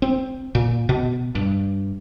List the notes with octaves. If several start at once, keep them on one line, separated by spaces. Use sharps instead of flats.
C4
A#2
B2
G2